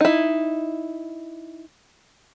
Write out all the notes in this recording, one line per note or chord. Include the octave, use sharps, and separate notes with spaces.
D#4 E4